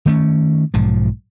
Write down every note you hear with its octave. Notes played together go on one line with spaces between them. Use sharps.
D#3 A3 C#4
B1 G#2 F3